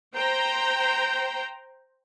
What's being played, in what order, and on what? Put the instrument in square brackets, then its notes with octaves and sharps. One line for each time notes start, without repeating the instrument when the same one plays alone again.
[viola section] C5 G5 A#5